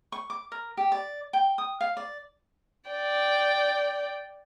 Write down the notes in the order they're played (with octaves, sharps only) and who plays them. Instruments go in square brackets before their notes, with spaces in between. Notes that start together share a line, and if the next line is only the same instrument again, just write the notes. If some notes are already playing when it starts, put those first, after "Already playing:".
[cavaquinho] C#6
D6
A#4
G4
D5
G5
D#6
F5
D5
[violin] D5 G5